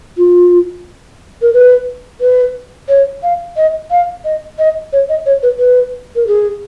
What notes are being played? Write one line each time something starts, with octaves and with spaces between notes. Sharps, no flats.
F4
A#4
B4
B4
C#5
F5
D#5
F5
D#5
D#5
C#5
D#5
C#5
B4
B4
A#4
G#4